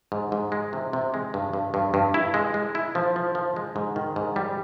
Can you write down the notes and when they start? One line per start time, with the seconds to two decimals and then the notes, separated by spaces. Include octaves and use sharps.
0.12 G#2
0.32 G#2
0.52 G#3
0.73 C3
0.93 C3
1.14 G#3
1.34 G2
1.53 G2
1.74 G2
1.94 G2
2.14 E4
2.34 G#3
2.54 G#3
2.75 E4
2.95 F3
3.16 F3
3.35 F3
3.56 G#3
3.76 G#2
3.96 D#3
4.16 G#2
4.36 G3